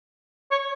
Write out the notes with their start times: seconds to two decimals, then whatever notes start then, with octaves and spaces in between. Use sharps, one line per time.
0.51 C#5